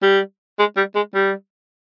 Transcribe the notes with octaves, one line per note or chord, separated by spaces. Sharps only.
G3
G#3
G3
G#3
G3